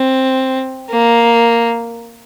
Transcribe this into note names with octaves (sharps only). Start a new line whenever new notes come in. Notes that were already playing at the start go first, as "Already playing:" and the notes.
Already playing: C4
A#3